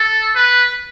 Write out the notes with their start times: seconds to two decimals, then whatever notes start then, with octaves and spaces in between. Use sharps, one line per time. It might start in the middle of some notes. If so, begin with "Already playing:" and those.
Already playing: A4
0.35 B4